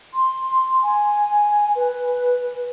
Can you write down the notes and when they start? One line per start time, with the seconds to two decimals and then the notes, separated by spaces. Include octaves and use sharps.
0.14 C6
0.83 G#5
1.75 B4